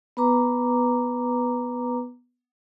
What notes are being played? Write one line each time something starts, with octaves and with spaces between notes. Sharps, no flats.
B3 B4 A#5 D6